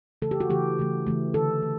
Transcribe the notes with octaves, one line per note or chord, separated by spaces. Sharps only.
C#3 E3 A3 A4
G4
F#4
C#3 E3 A3 G4
C#3 E3 A3
C#3 E3 A3
D3 A3 A4
A3